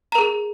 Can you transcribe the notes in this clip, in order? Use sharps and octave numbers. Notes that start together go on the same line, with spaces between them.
G#4 A#4 A#5